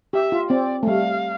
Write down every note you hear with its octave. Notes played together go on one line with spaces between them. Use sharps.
G4 E5
F4
C4 D5
A3
G3 F5